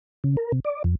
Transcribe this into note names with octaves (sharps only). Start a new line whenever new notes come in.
C#3
A#4
C3
D5
F2